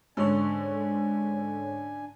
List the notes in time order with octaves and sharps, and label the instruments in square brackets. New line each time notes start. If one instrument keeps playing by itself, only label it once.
[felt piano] G#2 [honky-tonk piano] D3 C#4 [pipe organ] D4 G#5 [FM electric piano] A4 C#5